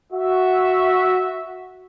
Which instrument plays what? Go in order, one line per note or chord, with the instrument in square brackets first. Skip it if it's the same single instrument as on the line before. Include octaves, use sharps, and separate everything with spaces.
[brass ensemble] F#4 E5